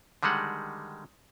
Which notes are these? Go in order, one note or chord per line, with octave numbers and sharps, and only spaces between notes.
D3 D#3 G3 G#3 F#5